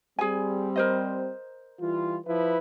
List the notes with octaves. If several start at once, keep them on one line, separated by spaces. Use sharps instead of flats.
G3 C4 G#4 G#5
A#4 C5 D#5
E3 G3 F4
F3 E4 B4